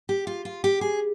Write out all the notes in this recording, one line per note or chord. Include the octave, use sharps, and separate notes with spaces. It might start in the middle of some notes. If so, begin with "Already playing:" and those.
G4
F4
F4
G4
G#4